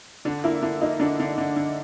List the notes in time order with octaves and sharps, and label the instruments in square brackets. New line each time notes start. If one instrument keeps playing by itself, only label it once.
[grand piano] D3 [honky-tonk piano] D4
[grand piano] A#3 [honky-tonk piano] E4
[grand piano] D3 [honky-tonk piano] E4
[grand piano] A#3 [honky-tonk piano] D#4
[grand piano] D3 [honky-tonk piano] D4
[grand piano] D3
D3
D3